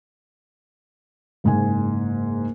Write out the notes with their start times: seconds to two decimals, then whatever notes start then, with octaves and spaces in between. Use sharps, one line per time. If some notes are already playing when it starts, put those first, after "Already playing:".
1.44 F#1 G#2 G#5